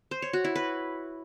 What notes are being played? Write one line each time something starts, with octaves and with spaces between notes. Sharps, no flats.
C5
C#5
F#4
E4
B4